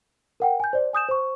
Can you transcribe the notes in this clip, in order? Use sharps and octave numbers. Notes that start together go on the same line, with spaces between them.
A#4 F#5 G5
G#5 G6
C5 D5
G#5 D#6 G6 E7
C5 C#6